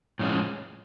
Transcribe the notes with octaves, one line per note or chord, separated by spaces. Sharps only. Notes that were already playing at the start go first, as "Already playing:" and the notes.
A2 F3 G#3 C#4